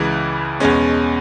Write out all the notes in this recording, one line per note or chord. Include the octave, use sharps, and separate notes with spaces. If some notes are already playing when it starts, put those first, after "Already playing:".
Already playing: C#2 C#3 E3
E2 B2 G#3 C#4